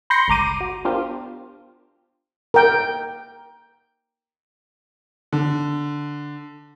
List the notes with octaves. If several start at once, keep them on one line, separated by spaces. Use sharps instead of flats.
B5 C6 G6 A#6 C7 C#7
G1 C#2 A#5 D6 D#7
F#4
B3 D4 F4 G4 A#4 C5
A#4 G5
D3